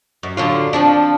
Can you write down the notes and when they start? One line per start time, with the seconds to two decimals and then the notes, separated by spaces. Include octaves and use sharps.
0.23 F#2
0.37 D3 F#3 F4
0.73 F3 C4 D4